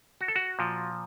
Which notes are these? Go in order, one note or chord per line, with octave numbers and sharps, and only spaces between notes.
F#4
A4
F#4
A#2 F3